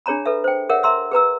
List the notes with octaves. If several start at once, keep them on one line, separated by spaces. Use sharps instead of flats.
D4 G#4 C#5 A#5 B5
A4 B4 E5
C5 G5
G#4 A#4 C#5 E5 F#5
E5 A#5 C6 E6
G#4 B4 A#5 E6